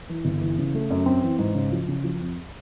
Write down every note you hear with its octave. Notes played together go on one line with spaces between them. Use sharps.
E3
G1
E3
C#3
A3
F#2
C4
E3
G#2
C#3
F3
C#3
F3
F2